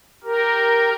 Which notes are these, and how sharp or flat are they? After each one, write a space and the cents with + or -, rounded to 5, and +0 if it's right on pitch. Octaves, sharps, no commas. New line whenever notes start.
G4 -10 A#4 +0